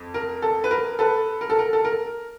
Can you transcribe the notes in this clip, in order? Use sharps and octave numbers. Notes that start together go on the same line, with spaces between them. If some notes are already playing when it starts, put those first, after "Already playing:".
Already playing: F2
A#4
A4
B4
A#4
A4 B4
A#4
A4
A#4
A4
A#4